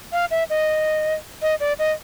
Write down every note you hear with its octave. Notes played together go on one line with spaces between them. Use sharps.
F5
E5
D#5
D#5
D5
D#5